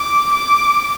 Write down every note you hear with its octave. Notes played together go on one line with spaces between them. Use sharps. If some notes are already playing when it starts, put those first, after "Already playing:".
Already playing: D6
D6